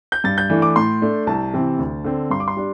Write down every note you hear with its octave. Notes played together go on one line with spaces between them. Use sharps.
G6
G2 A6
G6
E3 A3 D4
D6
A2 C6
A3 D4
C2 A5
C3 E3 C4
D2
D3 C4
G2 C6
D6
C6
G3 D4